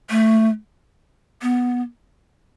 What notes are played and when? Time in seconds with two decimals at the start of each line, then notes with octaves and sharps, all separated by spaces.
0.10 A3
1.42 B3